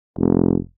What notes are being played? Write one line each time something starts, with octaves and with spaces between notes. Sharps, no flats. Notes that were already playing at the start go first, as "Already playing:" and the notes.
F1